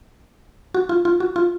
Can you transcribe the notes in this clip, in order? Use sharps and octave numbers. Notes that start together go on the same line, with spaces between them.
F#4
F4
F4
F#4
F4